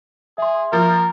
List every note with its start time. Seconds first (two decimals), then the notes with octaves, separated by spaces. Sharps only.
0.38 G#4 E5 C6
0.72 F3 A#3 A#4